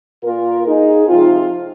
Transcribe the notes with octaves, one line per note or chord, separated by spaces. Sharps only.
A#2 A#3 F4 A#4
D#4 G#4
C3 F3 G#3 C4 F4